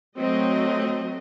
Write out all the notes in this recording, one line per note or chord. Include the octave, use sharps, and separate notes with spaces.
F#3 A3 C4 D#5